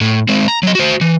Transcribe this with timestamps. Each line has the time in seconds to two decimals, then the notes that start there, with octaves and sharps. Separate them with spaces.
0.01 A2
0.29 G#3 C4
0.48 A#5
0.63 F#3 D#5
0.75 F#4 C5
1.01 E3